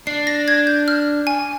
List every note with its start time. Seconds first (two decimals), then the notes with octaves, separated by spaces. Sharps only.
0.07 D4 C7
0.27 A#6
0.48 G#6
0.67 G6
0.88 F6
1.27 G#5